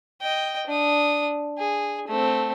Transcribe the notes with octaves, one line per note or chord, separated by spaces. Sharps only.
D#5 G5
D4 D#6
G#4
A3 C4